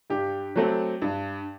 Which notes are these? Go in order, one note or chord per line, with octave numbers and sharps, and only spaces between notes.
G2 G4
F#3 A3 C4
G2